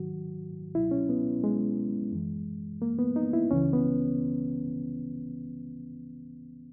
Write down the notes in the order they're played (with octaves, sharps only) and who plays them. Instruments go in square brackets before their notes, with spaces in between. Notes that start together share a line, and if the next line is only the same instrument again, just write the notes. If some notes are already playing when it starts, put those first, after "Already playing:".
Already playing: [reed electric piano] G#2 D#3 F#3 F#4
C#2 B2 F#3 E4
C#4
B3
G#3
F#2 E3
A#3
B3
D#4
E4
C#2 C#3 E3 C#4
B3